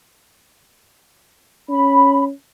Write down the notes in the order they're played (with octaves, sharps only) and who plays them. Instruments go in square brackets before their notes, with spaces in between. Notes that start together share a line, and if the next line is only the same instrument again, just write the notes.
[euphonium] C#4 [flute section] B5